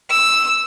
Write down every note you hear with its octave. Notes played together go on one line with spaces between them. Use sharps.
E6